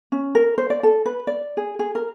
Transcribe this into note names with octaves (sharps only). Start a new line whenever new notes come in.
C#4
A#4
C5
D5
A4
B4
D5
G#4
G#4
A#4